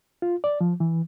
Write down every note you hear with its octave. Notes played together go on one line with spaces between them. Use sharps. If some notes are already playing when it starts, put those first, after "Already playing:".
F4
D5
F3
E3